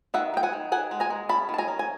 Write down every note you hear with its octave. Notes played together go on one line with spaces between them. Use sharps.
D#3 E5 F#5
D#3 G5
F#5 G#5
D#3
D#3 F#5 G#5
G#3
G#5 A#5
G#3
C#4 A5 B5
D#3
A5
G#5 A#5
C#4
G#5